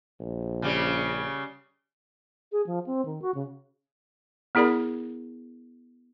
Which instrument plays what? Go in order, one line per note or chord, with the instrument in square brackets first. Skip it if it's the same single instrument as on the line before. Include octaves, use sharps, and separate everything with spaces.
[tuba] A#1
[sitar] C#3 G3
[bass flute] G#4
F3
C4
D#3
F#4
C#3
[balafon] B3 E4 G#4 A#4 D5 B5